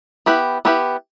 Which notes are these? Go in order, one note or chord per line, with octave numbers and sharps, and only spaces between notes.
B3 E4 G4 B4
B3 E4 G4 B4